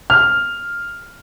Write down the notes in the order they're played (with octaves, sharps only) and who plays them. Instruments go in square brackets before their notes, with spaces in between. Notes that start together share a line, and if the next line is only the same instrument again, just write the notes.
[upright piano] F6